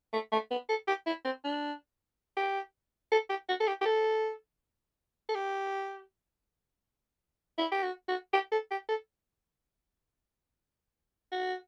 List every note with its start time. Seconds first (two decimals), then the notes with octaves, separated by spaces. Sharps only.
0.13 A3
0.32 A3
0.51 B3
0.69 A4
0.87 G4
1.06 E4
1.25 C4
1.44 D4
2.37 G4
3.12 A4
3.29 G4
3.49 F#4
3.60 A4
3.67 G4
3.81 G4
3.85 A4
5.29 A4
5.35 G4
7.58 E4
7.72 G4
7.83 F#4
8.08 F#4
8.33 G4
8.52 A4
8.71 G4
8.89 A4
11.32 F#4